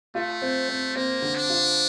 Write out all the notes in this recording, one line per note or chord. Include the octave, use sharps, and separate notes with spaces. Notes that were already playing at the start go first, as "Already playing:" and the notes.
A3 F4
C4
C4
A#3 C4
D3
D4
F4